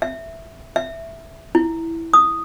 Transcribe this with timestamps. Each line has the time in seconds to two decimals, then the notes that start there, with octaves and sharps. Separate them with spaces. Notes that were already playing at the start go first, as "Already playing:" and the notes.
0.02 E5
0.76 E5
1.55 E4
2.14 D#6